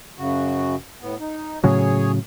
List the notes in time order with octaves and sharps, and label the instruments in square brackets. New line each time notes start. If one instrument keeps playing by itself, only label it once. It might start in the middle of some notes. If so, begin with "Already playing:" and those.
[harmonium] F#2 C#3 F#4
A2 B3
D#4
[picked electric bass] A2 C#3 F#3 [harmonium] G#4 C#5